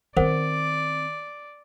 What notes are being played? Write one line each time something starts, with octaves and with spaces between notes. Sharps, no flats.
D#3 C4 A#4 C5 D5 F#5